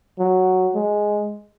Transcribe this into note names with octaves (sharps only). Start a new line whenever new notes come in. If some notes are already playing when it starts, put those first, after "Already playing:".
F#3
G#3